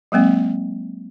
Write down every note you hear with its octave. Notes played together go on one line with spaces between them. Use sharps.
F#3 G#3 A#3 C4